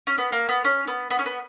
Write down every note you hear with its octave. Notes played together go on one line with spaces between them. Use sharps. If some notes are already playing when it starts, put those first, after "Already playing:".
C#4
B3
A#3
B3
C#4
B3
B3
C#4
B3